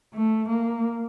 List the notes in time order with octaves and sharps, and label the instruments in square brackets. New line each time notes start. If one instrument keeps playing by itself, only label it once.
[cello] A3
A#3